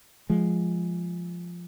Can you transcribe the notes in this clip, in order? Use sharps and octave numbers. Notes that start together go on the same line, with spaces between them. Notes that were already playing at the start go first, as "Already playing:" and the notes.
F3 G#3